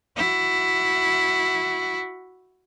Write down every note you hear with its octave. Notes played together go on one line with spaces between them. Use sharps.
E4 F#4